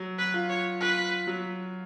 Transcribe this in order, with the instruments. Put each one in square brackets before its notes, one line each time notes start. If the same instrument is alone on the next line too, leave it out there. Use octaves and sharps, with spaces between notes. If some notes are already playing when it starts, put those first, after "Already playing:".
Already playing: [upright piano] F#3
[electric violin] B4
[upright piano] F4
[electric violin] C#5
[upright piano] F4 [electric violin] B4
[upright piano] F#3